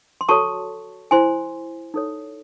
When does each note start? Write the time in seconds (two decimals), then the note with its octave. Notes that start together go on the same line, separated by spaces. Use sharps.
0.21 C6
0.29 F#4 A4 C#5 A5 C#6
1.11 E4 C5 G#5 C6
1.94 D#4 A4 C#5